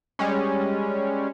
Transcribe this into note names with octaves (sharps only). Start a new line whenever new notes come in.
G3 G#3 C#4